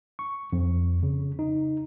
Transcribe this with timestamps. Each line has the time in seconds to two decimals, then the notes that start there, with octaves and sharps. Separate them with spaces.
0.19 C#6
0.53 F2
1.03 C#3
1.39 D#4